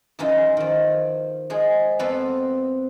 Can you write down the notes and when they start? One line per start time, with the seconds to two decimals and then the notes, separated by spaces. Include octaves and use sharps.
0.19 F#2 E3 D#4 F4
0.57 D#3 F3
1.50 F3 G#3 G#4
1.99 F2 B3 C4 F4 A4 B4